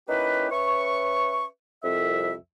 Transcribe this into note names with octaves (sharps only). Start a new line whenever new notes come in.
A#3 C#4 D#4 E4 G4 B4
C#4 B4 E5 C#6
C2 F2 E5